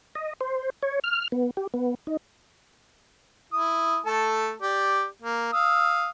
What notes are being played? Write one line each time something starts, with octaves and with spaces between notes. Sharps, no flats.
D#5
C5
C#5
F6
B3
G4
B3
D#4
E4 D#6
A3 A4 A5
G4 D5
A#3
F5 D#6 E6